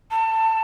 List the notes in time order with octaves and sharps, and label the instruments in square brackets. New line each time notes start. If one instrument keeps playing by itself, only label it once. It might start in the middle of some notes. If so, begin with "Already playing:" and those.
[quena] A5